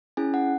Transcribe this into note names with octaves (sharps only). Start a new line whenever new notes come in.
C#4 E4 G#4 G#5
F#5